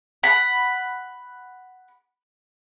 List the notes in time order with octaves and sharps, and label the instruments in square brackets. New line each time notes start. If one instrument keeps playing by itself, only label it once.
[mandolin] F#5 B5